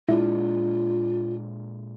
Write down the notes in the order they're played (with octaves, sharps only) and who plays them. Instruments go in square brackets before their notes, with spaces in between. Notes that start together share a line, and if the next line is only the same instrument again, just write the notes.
[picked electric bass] A#2 G#3 D4 [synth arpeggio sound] E4 [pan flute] F4